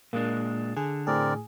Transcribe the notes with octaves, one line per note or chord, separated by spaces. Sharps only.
A#2 G#3 A#3 D4
D3 G#4
A2 C4 G#4 A#4 D5